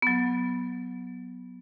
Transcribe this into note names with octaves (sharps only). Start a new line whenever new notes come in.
F#3 B3